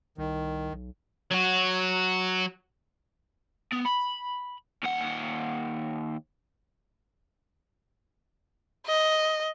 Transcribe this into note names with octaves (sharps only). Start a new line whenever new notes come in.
C2 D#3
B1
F#3 F#4
B3
B5
D#2 F#5
D#5